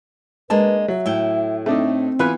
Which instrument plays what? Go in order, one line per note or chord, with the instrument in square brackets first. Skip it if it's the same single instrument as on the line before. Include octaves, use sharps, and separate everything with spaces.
[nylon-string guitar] G#3 A#3 D4 [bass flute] B4 [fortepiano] A5
[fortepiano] F#3 [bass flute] E5
[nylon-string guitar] A2 E4 G5
[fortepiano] A3 D4 D#4 [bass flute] C4
[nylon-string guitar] E3 B3 G#5 [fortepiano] F4 B4 F#6